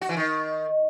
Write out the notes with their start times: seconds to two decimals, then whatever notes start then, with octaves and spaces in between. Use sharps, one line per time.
0.01 F#4
0.09 E3
0.17 D#3